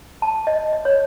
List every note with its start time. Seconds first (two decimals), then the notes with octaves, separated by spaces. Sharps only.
0.22 A5
0.47 D#5
0.73 D#5
0.85 C#5